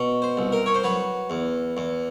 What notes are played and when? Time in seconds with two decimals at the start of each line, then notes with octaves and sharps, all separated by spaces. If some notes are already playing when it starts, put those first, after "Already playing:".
Already playing: B2
0.22 C5
0.37 C2
0.52 A#4
0.66 C#5
0.75 C5
0.84 F#3 B4
1.30 E2
1.77 E2